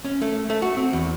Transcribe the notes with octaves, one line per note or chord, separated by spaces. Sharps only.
C#4
A3
A3
F#4
C4
E2